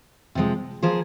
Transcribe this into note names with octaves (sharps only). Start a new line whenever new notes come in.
C3 F3 G#3
F3 A#3 G#4 C5